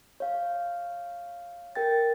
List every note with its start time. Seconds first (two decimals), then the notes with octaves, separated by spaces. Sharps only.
0.20 C#5 F5
1.75 A#4 G5 A6